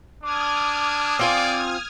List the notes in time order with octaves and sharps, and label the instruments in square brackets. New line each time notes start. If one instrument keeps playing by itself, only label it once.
[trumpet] D4 [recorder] D6 [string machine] D#6 F6 G#6
[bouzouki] C4 F4 G#5 [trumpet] D5